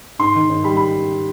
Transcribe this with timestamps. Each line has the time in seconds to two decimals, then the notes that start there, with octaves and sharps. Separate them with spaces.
0.19 G#2 C6
0.35 D#3
0.50 G#2
0.64 G3 B5
0.77 B5